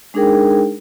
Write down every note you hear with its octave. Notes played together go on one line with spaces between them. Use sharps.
G#3 D4 D#4 G#4 A#4 G5